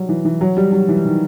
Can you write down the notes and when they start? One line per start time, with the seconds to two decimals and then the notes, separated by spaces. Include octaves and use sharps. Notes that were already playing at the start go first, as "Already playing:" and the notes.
Already playing: F#3 G3
0.09 E3
0.25 E3
0.41 F#3
0.57 G3
0.72 F#3
0.89 E3
1.05 D#3